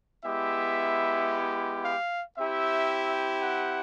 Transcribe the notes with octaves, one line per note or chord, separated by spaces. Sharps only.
G#3 B3 E4 G4 E5
F5
C4 E4 G4 E5
F#5